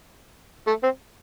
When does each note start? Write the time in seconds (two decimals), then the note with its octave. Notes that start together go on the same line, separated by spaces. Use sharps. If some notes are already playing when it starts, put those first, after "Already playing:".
0.67 A3
0.83 C4